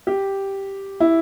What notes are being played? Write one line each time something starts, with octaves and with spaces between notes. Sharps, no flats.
G4
E4